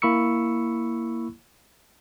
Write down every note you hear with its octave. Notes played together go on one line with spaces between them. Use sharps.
A#3 E4 B5 C#6 E6 C#7